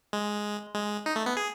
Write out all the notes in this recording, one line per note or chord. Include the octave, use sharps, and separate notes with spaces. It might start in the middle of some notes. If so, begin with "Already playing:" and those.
G#3
G#3
D#4
A3
B3
G#4